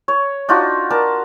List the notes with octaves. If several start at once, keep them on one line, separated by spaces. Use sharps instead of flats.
C#5
D4 D#4 F4 F#4
A#4 D5 A5